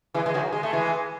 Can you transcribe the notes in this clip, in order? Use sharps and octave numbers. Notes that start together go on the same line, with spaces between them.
E3 G#3
E3 G#3
D#3 F#3
G#3
A3
E3 G#3